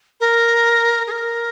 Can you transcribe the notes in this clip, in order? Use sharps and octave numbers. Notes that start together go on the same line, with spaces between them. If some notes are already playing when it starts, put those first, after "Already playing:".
A#4
G#4
A#4